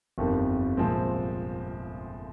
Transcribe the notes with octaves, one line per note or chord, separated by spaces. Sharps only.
G1 F2 D#3 G3
C2 A#2 F3 G#3 C4